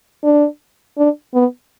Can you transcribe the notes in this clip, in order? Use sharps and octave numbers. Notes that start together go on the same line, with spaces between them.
D4
D4
B3